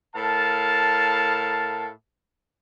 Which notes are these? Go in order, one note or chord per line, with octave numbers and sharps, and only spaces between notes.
A2 A#4 F5 A5